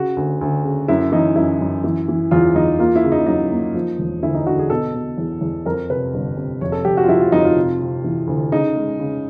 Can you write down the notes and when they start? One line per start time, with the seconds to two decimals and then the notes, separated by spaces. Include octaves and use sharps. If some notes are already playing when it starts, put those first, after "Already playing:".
Already playing: C#3 F#4
0.17 D2
0.41 D2
0.64 C#3
0.88 F#2 E4
1.12 E3 D#4
1.36 F#2 E4
1.60 F#2
1.84 E3
2.08 E3
2.31 E2 F4
2.55 E2 D#4
2.79 A#3 F4
2.96 E4
3.04 C#3
3.12 D#4
3.26 F#3 D#4
3.51 A#3
3.75 F3
3.99 E1
4.23 D2 E4
4.35 D#4
4.46 D3 F#4
4.59 G#4
4.70 B2 A4
4.94 B2
5.18 E2
5.41 E2
5.66 F2 A#4
5.90 C3 B4
6.14 G1
6.37 C3
6.61 F1 C#5
6.72 A4
6.85 F1 G4
6.97 F#4
7.04 F4
7.09 F2 E4
7.20 F4
7.32 F2 D#4
7.45 F4
7.57 C3
7.80 C3
8.04 E3
8.27 D2
8.52 C#3 D#4
8.76 G#3
9.00 C#3